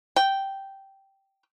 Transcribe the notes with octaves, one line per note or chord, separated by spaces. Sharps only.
G5